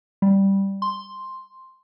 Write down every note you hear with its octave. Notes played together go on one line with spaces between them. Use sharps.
G3
C6